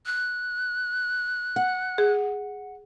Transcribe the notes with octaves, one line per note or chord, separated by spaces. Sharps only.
F#6
F#5
G#4